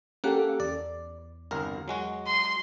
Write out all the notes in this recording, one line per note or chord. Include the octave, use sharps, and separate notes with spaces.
A#3 C#4 G4 A4 F#5
E2 D5
G1 C2 A#4
F#3 G#3 F#4
C6